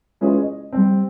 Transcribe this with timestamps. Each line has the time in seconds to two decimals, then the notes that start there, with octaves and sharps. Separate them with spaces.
0.21 G#3 C#4 E4 F4 G#4 B4
0.40 D#5
0.73 G3 C4